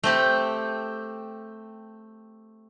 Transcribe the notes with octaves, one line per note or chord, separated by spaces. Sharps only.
A3 C4 G4